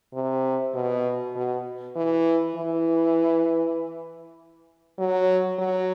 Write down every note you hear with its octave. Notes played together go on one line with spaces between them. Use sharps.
C3
B2
B2
E3
E3
F#3
F#3